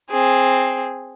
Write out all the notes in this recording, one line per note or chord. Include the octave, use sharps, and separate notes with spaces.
C4 G#4